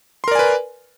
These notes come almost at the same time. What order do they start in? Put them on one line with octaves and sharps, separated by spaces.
C6 A#4 D5 G#5 B4